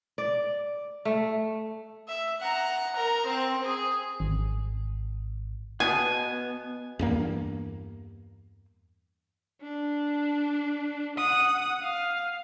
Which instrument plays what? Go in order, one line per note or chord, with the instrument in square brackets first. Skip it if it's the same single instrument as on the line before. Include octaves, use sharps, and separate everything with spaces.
[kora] D5
A3
[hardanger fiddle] E5
F#5 A#5
A#4 A#5
C4 C5
G#4
[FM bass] G#1
[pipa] B2 [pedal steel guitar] B3 [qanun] G#5
[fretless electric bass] E2 G2 A#3
[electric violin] D4
F#5 D#6
F5